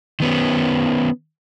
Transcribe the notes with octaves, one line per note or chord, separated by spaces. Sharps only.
D#3 B3 C#4